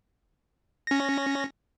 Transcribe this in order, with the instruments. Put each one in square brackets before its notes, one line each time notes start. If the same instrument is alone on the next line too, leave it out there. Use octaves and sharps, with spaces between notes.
[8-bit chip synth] C#4 A#6